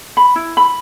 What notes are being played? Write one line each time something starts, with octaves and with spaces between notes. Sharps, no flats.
B5
E4
B5